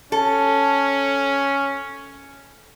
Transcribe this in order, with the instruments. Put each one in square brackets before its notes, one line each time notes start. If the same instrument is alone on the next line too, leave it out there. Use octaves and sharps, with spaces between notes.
[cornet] C#4 [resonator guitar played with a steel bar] A4